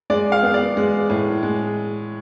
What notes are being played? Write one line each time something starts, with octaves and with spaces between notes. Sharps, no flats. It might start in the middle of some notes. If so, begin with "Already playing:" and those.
G#3 D5
F5
B3
D5
G#3
A2
G#3